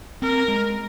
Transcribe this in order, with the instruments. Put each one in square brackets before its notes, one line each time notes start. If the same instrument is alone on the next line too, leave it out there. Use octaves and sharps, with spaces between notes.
[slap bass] C4 [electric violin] A#4
[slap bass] G#3